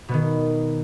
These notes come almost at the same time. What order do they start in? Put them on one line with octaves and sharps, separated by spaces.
B2 B3 D#3